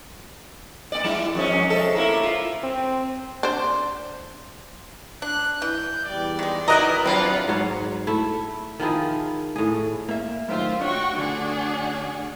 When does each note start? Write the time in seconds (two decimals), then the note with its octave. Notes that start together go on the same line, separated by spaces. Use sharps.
0.92 A#3 D5
1.04 G3 E4
1.35 F2 G#2 C#4
1.70 C3 G#3 A4
1.95 A3 A#3 E4
2.23 F4
2.63 C4
3.43 D4 C5
5.22 D4 F#6
5.62 E3 G6
6.05 E2 G3 D5
6.39 D#3 G#3
6.68 F2 E3 D#4 E4 F#4 A#4 D#5 A#5
7.06 F#3 C4 D4 F4 B4 F#5
7.48 G#2 F#3 C#5
8.07 A3 E4
8.80 D#3 F3 E4 G#4
9.56 A2 G#4
10.09 A#3 E5
10.48 F#2 A2 D#3 F4 C5 E5
10.81 D4 F#4 C#5 G5 C#6
11.17 D2 D3 D4 F#4 G#4